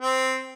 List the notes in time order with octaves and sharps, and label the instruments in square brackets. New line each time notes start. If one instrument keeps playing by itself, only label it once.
[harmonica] C4